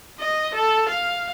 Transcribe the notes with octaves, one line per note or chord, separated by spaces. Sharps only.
D#5
A4
F5